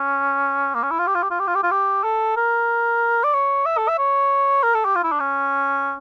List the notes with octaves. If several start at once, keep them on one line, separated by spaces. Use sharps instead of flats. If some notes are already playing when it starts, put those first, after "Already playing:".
Already playing: C#4
A#3
C#4
E4
F4
G4
F4
G4
F4
G4
F4
G4
F4
G4
A4
A#4
D5
C#5
E5
A4
E5
C#5
A#4
A4
G4
F4
E4
D4
C#4